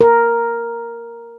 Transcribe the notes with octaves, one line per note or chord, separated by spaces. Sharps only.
A#4